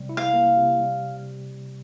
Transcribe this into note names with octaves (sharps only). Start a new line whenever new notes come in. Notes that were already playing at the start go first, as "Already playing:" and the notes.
Already playing: C3 G3
E4
F5
A#3
C3
G3